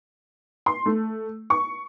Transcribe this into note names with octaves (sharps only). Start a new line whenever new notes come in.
C6
A3
C#6